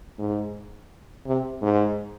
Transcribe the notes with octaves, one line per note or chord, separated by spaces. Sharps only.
G#2
C3
G#2